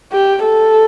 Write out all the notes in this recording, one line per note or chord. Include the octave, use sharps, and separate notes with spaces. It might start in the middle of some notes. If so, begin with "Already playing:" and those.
G4
A4